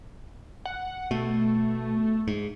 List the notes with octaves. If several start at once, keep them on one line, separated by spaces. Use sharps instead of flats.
F#5
B2 A3
G#2